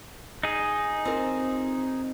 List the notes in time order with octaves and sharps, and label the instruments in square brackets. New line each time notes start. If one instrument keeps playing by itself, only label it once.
[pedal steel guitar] D#4 G#4
[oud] C4 F4 A#4